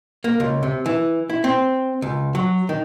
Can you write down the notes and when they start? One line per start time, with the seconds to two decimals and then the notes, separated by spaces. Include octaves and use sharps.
0.24 A#3
0.40 C#2
0.63 C3
0.86 E3
1.30 E4
1.44 C4
2.02 C#2
2.35 F#3
2.69 D#3